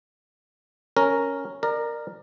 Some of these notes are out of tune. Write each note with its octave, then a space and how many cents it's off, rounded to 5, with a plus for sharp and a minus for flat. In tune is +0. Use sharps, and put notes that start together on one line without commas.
C#4 +0 A#4 +0
A#4 +0 D5 +30